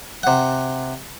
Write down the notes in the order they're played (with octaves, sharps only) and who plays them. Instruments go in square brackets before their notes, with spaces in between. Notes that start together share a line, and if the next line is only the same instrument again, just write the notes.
[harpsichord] C3 F#5